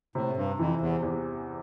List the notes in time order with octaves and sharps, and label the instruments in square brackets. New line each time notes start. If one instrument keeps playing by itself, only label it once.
[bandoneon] A2 [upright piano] C3
[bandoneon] G2
[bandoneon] F2 [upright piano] E3
[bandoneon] E2
[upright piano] E2